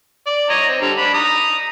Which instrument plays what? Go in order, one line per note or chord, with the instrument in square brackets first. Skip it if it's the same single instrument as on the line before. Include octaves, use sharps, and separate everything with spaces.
[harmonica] D5
C#5 D#5 A#5
C4
D3 G3 A#5
D4 B5
A#5 D#6